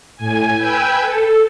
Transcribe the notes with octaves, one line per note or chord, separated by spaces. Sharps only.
A2 G#5
B4 G5 G#5 E6 G6
A4